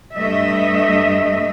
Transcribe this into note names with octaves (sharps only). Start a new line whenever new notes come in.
G2 A3 D#5 E5